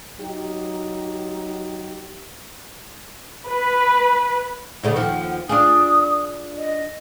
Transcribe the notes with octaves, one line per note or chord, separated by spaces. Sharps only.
F#3 D#4 G4
B4
D2 C#3 A3 F#5
D#2 F3
D4 F4 G#4 D#6
D#5